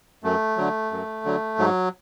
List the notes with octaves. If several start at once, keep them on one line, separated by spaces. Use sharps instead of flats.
F#2 A3
D3 F#3
F#2
D3 F#3
G#2 F#3